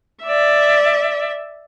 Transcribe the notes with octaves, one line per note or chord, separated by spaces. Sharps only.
D5 E5